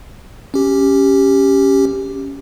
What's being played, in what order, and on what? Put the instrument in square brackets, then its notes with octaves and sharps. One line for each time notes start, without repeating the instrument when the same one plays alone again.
[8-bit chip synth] C#4 G4